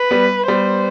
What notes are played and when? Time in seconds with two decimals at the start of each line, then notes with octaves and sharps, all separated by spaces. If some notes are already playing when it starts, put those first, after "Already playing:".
Already playing: B4
0.11 G3 B3
0.48 G3 B3 C5